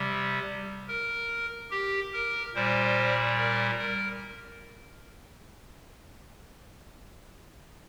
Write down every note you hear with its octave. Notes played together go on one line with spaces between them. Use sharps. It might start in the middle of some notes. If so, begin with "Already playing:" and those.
Already playing: C3 G3
A#4
G4
A#4
A#2 G3 C5
A#4
A#4